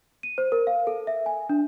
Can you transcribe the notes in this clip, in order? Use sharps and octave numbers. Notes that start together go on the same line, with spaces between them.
D#7
C5
A#4
F5
A4
E5
G#5
D4